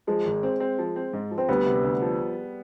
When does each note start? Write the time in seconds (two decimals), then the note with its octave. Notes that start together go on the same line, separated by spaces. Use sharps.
0.07 F3 G#3
0.25 G#1
0.43 C4
0.60 C4
0.78 F3
0.96 C4
1.13 G#2
1.31 F3
1.38 C4
1.49 D2 G3 B3
1.66 C3
1.83 D2
2.02 F3